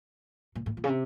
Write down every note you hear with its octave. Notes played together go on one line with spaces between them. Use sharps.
A#2
A2
A#2
C#3
C3